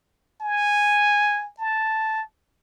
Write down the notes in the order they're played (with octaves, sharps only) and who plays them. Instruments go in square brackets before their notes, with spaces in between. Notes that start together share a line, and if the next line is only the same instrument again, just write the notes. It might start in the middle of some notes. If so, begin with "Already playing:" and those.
[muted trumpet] G#5
A5